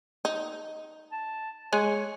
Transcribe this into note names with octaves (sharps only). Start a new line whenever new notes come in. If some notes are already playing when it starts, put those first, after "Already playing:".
D#4
A5
G#3 G#4 C#5 G#5